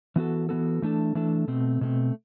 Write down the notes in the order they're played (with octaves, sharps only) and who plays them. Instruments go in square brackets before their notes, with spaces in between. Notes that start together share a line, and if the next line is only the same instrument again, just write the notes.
[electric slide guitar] E3 B3 F#4 A4
E3 B3 F#4 A4
E3 A3 D4 A4
E3 A3 D4 A4
B2 A3 C4
B2 A3 C4